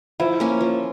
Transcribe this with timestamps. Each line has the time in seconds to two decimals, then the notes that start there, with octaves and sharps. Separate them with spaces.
0.20 F3 E4
0.40 A#3 C#4
0.61 F3